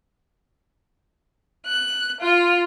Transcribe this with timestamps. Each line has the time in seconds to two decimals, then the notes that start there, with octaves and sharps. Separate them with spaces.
1.67 F#6
2.20 F4